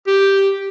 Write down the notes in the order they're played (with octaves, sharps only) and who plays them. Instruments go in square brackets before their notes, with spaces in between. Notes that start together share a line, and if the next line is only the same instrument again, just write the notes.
[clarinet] G4